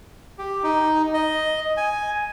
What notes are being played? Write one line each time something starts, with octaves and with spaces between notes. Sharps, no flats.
G4
D#4
D#5
G#5